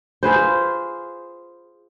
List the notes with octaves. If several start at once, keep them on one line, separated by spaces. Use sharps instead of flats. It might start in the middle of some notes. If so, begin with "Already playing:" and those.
F4 G#4 B4 C5